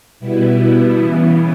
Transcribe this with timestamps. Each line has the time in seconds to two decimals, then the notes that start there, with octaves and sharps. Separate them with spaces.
0.19 B2 G3 B3 E4
0.98 C#3 E3 B3